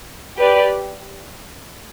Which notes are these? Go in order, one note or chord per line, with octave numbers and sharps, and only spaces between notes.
G4 B4 D5